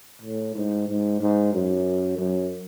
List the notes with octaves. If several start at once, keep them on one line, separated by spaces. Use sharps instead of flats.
A2
G#2
G#2
G#2
F#2
F#2